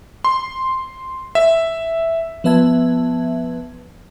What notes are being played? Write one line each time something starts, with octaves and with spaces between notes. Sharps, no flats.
C6
E5
F3 B3 B4 E5 A5 G#6